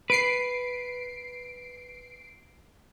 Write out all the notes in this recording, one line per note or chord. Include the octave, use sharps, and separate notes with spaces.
B4 C7 D7